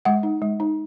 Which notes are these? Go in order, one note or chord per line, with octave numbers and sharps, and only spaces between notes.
G#3 F#5
D#4
G#3
D#4